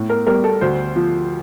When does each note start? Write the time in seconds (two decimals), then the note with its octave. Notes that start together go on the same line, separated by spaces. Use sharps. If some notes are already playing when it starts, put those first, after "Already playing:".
Already playing: A2
0.09 A#4
0.27 G3 A#4
0.44 A4
0.61 D2 C5
0.96 F3